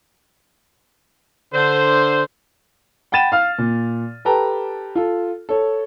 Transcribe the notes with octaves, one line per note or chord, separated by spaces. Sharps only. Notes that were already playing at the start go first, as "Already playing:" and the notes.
D3 C5
F#5 G5 B5 A6 D#7 E7
F5 F6
A#2
G4 A4 B4 G5 A5 A#5
F4 A4
A4 C#5